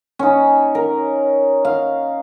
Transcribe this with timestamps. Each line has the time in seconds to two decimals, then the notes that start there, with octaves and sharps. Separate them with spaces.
0.19 C#4 D#4
0.75 A#4
1.65 F5